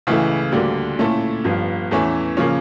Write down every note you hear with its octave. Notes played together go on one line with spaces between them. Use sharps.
C#2 C#3 E3 A3 E4
D2 D3 G3 A#3
A#2 A3 C#4 E4 A4
G1 G2 F3
E2 E3 A3 C#4 E4
C#3 F3 A#3 C#4